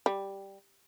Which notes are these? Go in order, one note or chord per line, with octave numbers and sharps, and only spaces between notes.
G3